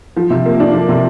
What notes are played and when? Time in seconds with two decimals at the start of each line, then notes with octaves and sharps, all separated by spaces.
0.17 F3
0.30 C3
0.45 A#3
0.60 D4
0.74 F3
0.89 C3